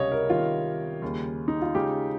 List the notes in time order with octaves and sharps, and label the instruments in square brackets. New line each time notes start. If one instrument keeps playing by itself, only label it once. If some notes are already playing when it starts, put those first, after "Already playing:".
Already playing: [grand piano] C#2 C3 G3 C#4 [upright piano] C#5 D#5 F5
[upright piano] A#4
[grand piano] C3 D#3 G3 [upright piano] F4
[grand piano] D#2 C#3 G3
[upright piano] D#4
F4
[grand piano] C#3 G#3 C#4 G#4 [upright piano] G4